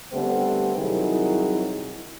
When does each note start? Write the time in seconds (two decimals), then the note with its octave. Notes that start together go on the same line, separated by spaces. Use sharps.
0.11 D3 G3 A3 B3 C4
0.76 C2 D#3 F#3 E4 G#4